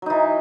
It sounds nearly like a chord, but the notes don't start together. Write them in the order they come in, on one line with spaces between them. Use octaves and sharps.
F#3 D#4 E3